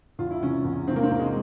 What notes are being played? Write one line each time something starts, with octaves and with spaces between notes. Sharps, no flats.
E2 F4
E4
C3 E3 C#4
E2
C3 E3 C4
A#3
C4
E2 A#3
G#3